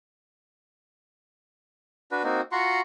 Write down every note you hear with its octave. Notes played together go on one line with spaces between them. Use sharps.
D4 F#4 B4
A#3 C4 D#4 F#4
F4 F#4 F#5 A#5 C6 C#6